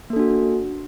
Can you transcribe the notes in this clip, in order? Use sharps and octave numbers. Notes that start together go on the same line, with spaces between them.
A#3 D4 F#4 A4